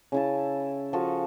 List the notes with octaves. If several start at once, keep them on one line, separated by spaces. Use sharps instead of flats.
C#3 E4 A5
F3 F#4 A4 A5